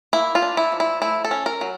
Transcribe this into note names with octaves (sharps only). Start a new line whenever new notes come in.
A#3 E4
F4
D4
E4
F3
E4
A3 E4
A4
C#4
A#4
F#3